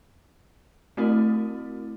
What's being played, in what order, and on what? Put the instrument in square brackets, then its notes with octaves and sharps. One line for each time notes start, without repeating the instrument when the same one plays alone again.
[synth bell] A3 C4 E4 F#4 A#4